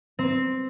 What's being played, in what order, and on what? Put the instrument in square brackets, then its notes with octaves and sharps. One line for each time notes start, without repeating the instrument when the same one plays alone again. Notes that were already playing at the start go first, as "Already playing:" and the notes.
[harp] C4